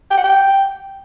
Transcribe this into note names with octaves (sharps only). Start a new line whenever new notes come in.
G5
F#5
G5